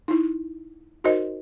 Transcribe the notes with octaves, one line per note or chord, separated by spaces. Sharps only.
D#4 E4
D#4 F#4 A#4 C5 D#5